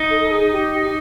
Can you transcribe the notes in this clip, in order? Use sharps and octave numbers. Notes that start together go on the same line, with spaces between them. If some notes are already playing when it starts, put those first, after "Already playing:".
Already playing: D#4
A4
A4
G#4
G4
G4